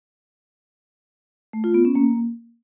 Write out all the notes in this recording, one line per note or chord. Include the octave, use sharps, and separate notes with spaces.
A3
F4
B3
C#4
A#3